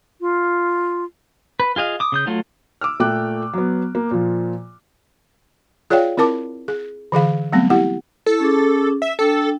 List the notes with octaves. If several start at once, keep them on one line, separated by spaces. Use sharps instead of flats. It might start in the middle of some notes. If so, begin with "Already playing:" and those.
F4
B4
F4 G#4 D#5 F5
D6 D#6
C#3 D#6 G6
F#3 A3 F4
D6 E6 F6
A#2 A3 G5 D6 F#6
F#3 B3
A#3
A#2 F3
F4 G#4 C#5 D5 F5 G5
C4 E4 A#4 A5 D6
G#4
D3 E3 G#4 F5
F#3 G3 A3 B3 C4
E4 G4 F#5
E4 A4
C#4 G#4 D6
E5
D4 A4 G5